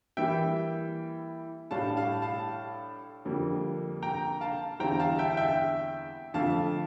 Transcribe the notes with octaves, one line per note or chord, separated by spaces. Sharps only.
E3 G3 A#3 E5 G5
A2 G3 D4 F5 A5
F5 A5
F5 A5
F2 D3 G3 A#3
G5 A#5
F5 A5
E2 D3 G3 C4 E4 G5 A#5
F5 A5
E5 G5
E5 G5
F2 D3 A3 F5 A5